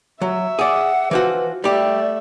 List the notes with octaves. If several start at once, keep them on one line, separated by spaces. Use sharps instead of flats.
F#3 E5
G#4 D5 F#5
E3 F3 F#4 B4
G3 A3 G4 D5 E5